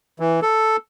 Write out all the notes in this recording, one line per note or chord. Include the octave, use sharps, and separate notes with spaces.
E3
A4